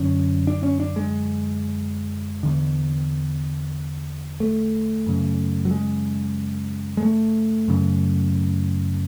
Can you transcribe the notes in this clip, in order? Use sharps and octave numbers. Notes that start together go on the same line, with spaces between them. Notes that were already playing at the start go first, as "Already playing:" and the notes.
Already playing: F#2 D3 C#4
D4
C#4
D4
G#3
E2 D3
A3
F#2 C#3
F#3
G#3
G#3
A3
F#2 C#3